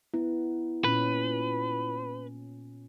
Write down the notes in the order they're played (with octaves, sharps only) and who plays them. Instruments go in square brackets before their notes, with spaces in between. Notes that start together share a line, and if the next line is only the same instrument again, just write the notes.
[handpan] B3 [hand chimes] E4
[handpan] A#2 C#4 [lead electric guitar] B4